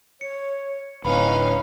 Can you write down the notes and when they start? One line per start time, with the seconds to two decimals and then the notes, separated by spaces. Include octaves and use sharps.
0.21 C#5 C#7
1.05 D1 C#4 D#4 B4 F5 B5